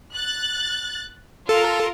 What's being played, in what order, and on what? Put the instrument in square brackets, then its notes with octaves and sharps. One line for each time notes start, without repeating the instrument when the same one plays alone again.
[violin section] F#6 A6
[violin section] F4 A#4 [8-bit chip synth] A4